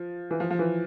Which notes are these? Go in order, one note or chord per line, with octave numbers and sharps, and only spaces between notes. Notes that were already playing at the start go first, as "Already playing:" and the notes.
Already playing: F3
E3
F3
F3
E3